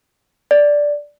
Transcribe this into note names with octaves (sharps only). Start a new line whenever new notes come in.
D5